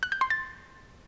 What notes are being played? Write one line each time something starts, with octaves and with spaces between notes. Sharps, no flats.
F#6
G6
C6
A6